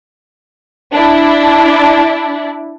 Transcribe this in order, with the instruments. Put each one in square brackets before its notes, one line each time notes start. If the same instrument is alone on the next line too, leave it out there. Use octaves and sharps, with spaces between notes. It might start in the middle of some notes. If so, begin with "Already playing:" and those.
[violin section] D4 E4